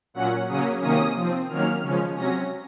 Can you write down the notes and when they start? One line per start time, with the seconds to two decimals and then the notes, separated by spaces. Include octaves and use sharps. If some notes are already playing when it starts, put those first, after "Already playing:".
0.14 A#2 F#3 C#4 F#5
0.48 C#3 F#3 A#3 C#4 D#6
0.81 C3 D#3 A#3 C#4 D#6
1.14 F3
1.20 C4
1.49 D#3 F#3 A#3 C#4 F6
1.83 C#3 F3 G#3 C#4
2.16 C3 F#3 C#4 A#6